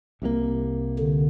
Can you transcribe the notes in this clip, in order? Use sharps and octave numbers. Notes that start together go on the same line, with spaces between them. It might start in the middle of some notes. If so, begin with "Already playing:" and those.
C2 C3 F3 A#3
D3